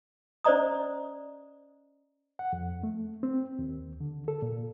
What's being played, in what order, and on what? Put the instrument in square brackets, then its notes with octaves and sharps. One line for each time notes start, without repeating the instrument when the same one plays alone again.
[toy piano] C#4 C5 D5 D#5 A#5 D#6
[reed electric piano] F#5
F2
A3
C4
D#2
D3
A4
A#2